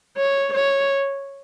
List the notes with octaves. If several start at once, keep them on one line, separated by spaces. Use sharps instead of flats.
C#5
C#5